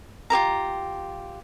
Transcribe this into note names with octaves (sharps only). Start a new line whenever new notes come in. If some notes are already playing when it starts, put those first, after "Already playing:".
F4 G4 A#4 A#5